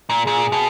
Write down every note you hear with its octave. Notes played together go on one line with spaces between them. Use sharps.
A#2
A#2 G#4
B2